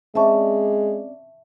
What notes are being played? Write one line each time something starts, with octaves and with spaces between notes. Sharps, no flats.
G#3 C4 C#4 D5 E5 A5 C#6